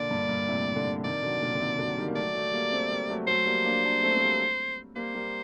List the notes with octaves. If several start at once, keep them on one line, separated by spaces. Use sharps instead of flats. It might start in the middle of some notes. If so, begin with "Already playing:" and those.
Already playing: A#2 D3 D5
G2 A#2
G2 A#2
A2 C3
A#2 D3
C3 D#3 D5
D3 F#3
A#2 D3
D3
C3 D#3
D3 F#3
D#3 G3
A#3
F#3 A3 D5
F#3 A3
G3 A#3
A3 C4
G3 A#3
F#3 A3
F#3 A3 C5
G3 A#3
A#3 D4
A#3 D4
A3 C4
C4
G3 A#3
G3 A#3 C5
G3 A#3